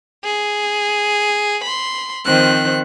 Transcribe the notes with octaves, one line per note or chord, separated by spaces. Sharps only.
G#4
B5 C6
D#3 F3 C4 F#6